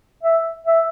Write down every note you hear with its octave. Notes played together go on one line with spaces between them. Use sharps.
E5
E5